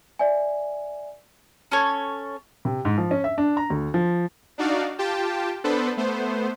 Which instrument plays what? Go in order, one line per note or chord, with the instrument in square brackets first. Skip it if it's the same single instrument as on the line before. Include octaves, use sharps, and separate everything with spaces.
[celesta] D5 E5 G#5
[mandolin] C#4 A4 C#5
[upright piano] C3
G#2
F3
C#4
E5
D4
A#5
D2
F3
[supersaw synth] D4 D#4 F#4 D5 F5
F4 G4 G5 A5
B3 D4 A4 B4 C5
A3 B3 C5